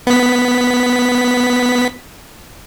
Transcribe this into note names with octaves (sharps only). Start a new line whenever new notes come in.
B3 B6